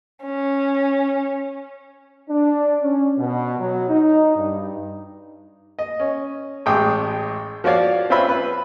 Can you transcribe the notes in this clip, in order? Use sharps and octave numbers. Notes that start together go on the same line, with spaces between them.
C#4
D4
C#4
B2
F#3
D#4
G2
D#5
C#4
A1 G#3 G5 D6 D#6
F3 F#4 C#5 D5 F5
C4 C#4 F4 B4 E5 B5
B4